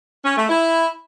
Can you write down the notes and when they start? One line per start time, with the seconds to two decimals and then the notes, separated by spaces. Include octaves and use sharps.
0.25 C#4
0.37 A3
0.48 E4